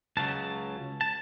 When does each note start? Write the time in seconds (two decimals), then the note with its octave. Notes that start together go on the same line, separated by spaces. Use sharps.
0.17 C#2 C#3 F#3 A5
1.01 A5